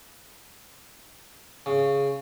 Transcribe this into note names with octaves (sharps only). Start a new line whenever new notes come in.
C#3